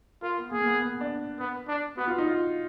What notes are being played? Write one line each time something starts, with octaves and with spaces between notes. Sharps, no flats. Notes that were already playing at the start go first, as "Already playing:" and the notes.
F4 A#4
B3
A#3 G#4
A#3
B3
B3
D4
B3
D4
B3 F#4
F4
D#4
F4